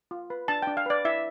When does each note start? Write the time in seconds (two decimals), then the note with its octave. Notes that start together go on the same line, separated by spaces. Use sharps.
0.11 F4
0.30 B4
0.48 D4 A5
0.62 D4 G5
0.77 F5
0.86 B4 D5
1.05 E4 E5